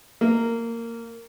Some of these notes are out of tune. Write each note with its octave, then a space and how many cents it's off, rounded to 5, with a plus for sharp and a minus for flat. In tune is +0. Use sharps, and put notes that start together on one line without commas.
A#3 -15